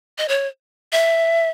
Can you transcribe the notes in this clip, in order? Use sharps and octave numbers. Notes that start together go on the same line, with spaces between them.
D#5
C#5
E5